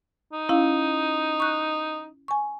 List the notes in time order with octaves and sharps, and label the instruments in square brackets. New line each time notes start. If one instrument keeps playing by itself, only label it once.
[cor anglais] D#4
[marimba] C#4 E4 F5
C#6 F#6
G#5 C#6